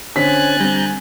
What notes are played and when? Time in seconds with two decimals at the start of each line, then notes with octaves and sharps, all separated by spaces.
0.16 D3 C4 C#4 G#5 F#6 A6 B6
0.60 G3 C4 A#5 G6